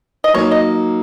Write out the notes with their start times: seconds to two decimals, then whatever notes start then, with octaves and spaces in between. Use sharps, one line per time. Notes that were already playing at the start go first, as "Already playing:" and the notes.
0.24 D#5
0.34 F#3 A#3 D#4 C#5
0.51 D#5